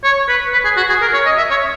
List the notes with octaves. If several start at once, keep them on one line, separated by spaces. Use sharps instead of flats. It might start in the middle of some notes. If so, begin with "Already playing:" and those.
C#5
B4
B4
G#4
F#4
G#4
A#4
C#5
D#5
E5
C#5